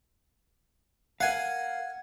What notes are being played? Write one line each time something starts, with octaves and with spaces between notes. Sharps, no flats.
A#4 F5 F#5 G#5